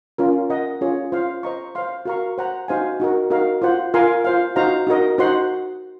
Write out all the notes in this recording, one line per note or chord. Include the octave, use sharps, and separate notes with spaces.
C#4 F4 A#4
A#4 D#5 F#5
C#4 F4 G#4 C#5
F4 C5 F5 C6
C5 D#5 A#5 C#6
C5 F5 C6
F#4 A#4 F5 A#5 C#6
C5 F#5 A#5
D#4 F#4 C5 F5 G#5
D#4 F#4 A#4
D#4 F#4 A#4 F5
F4 C5 F#5
F4 A#4 F5 G#5 C6
F4 C5 F5
D#4 F#4 C5 F5 A#5
D#4 F#4 A#4 D#5
D#4 F#4 C5 F#5 C6